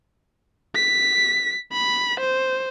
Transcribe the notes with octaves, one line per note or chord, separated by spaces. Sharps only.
B6
B5
C5